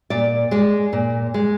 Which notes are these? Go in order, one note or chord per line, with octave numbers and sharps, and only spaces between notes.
A#2 D5
G#3 D5
A#2
G#3